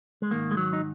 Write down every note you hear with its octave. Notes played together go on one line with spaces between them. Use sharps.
G#3
G#2 D#3 A#3
G#3
F#3
D#4